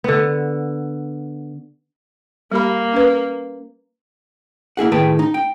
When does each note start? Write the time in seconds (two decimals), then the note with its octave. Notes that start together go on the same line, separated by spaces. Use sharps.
0.04 D3 B3
2.52 G3 A#3 G4 B5
2.93 C#4 B4
4.77 A#3 E4 G#4 F#5
4.92 A2 D#3 G#4 B4 G5 A5
5.19 D#4
5.34 G5